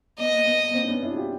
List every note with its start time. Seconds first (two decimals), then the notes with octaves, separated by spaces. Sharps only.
0.18 B3 D#5
0.31 A#3
0.45 B3
0.68 B3
0.74 A#3 C4
0.83 D4
0.88 B3 C#4
1.03 D4 E4
1.12 F#4
1.16 F4 G4